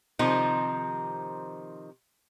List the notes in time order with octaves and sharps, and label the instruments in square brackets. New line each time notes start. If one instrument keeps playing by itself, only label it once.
[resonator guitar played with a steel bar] C3 D#3 F3 C4 D#4